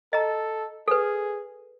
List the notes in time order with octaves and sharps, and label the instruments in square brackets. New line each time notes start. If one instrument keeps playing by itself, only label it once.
[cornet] A4 [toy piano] D#5 A#5
[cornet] G#4 [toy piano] A4 B4